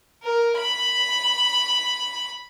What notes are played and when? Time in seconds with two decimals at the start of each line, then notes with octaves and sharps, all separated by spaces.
0.23 A#4
0.57 B5